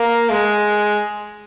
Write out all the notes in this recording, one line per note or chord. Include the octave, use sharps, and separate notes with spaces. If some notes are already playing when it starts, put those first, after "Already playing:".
Already playing: A#3
G#3